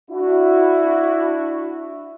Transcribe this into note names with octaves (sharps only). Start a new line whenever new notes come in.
D4 E4 F#4